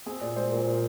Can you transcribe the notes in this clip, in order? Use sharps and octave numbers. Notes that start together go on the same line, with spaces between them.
C4 G#4
A#2 D5
G#3 C5
A#2 A#4
A#2